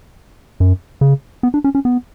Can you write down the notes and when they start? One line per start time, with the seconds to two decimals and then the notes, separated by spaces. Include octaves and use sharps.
0.60 F#2
1.01 C#3
1.43 B3
1.54 D4
1.64 C#4
1.75 C#4
1.85 B3